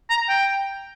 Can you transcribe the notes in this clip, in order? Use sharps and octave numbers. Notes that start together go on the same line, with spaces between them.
A#5
G5